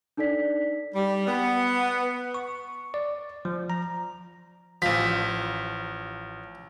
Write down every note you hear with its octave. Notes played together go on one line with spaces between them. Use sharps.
D4 D#4 A4 D5 B6
G3
B3
C#6
D5
F3
A#5
A1 F3 B6